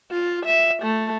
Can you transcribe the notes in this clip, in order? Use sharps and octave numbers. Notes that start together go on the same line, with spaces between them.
F4
E5
A3